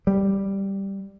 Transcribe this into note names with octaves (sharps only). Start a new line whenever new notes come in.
G3